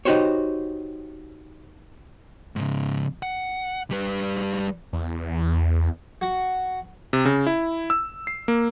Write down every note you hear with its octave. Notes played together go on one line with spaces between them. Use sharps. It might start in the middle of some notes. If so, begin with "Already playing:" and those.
D#4 F#4 G4 C5 C#5
G#2 C#3
F#5
G3 B4
E2
F#4
C3
C#3
E4
E6
C7
A#3